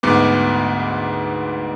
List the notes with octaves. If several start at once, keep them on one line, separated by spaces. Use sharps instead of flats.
D2 G#2 B3 D6